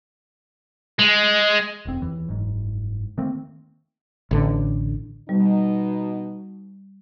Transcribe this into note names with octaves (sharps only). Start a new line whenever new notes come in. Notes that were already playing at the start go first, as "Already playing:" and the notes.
G#3
E1 F2 C4
D#2 E3
F#1 G#2
D#3 A3 A#3 C4
A1 D3
B2 G3 D#4